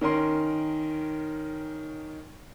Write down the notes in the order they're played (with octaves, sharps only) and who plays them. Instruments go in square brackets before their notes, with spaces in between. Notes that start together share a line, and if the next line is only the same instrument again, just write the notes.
[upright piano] D#3 C#4 A#4 C6